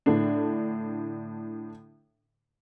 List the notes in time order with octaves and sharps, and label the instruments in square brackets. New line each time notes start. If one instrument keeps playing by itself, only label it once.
[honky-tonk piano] A2 D3 D4